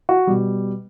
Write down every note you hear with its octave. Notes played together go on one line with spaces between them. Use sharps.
F#4
B2 G3